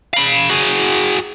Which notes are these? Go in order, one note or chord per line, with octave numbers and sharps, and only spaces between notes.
F5 B5
F#4 G#4